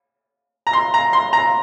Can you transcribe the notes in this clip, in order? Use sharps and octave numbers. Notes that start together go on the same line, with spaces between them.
A#5
C6
A#5
C6
A#5